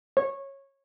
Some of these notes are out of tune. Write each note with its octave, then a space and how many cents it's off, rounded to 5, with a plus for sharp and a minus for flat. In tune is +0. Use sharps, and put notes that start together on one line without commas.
C#5 -15